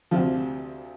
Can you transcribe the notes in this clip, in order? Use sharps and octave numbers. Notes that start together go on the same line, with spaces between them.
D2 C3 F3